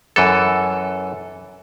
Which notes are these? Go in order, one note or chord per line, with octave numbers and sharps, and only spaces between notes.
F#2 E3 A4